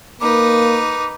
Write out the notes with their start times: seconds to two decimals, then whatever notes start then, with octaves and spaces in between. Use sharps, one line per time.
0.21 A#3 D#4 B4 D6